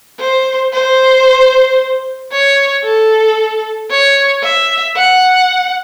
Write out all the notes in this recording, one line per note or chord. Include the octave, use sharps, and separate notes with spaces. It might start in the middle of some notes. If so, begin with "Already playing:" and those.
C5
C5
C#5
A4
C#5
E5
F#5